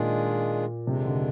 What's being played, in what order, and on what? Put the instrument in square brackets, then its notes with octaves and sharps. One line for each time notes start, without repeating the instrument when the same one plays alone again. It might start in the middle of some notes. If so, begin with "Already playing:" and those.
Already playing: [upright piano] A#2 [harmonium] D#3 G#3 D4 F4 G#4
[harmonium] F2 D#3 G#3 D4 [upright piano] C3
[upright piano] D3